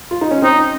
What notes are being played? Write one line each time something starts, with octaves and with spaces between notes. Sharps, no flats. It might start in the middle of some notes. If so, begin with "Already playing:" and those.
F4
D#4
C#4
C4 D#4